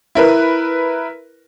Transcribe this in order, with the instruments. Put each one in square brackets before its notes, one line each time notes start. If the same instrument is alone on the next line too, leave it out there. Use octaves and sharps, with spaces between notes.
[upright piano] E4 A#4 B4